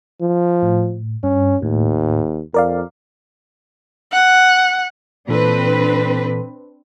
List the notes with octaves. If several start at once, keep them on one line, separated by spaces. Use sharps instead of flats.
F3
A2
G2 C#4
D#2 A2
F2 A#4 D5 F5
F#5
A#2 E3 C4 D4 A4 B4